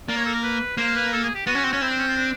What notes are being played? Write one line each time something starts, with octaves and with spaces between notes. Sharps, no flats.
A#3 D5
C#5
A4
A#4
B4
A#3 C5
B4
A4
G#4
G4
B3 F#4
C#4
C4
C#4
C4 E4
D4
C#4
F4
D4